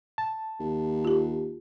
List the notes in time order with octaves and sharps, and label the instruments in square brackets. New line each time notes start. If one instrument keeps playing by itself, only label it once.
[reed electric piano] A5
[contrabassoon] D#2
[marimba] F4 G4